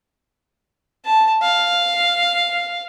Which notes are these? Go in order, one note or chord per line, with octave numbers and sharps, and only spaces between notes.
A5
F5